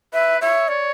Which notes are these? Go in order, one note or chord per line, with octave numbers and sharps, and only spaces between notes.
B4 E5
C#5 E5
C#5 D5